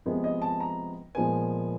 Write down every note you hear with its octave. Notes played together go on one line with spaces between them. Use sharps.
C3 F3 G#3 B3
D#5
A5
A#5
A#2 F3 G#3 B3 G#5